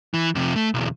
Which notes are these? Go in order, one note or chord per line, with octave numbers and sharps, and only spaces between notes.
E3
F2 C3
A3
B1 E2